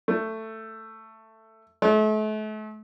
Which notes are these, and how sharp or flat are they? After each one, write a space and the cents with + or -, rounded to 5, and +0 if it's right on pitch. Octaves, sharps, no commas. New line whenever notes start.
A3 +10
A3 -40